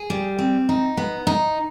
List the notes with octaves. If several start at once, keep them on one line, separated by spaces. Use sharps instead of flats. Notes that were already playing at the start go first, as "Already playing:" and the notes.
Already playing: G#4
G3
C4
D#4
B3
D#4